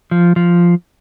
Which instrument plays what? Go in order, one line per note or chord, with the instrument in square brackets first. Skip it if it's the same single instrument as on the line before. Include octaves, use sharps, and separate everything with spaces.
[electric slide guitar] F3
F3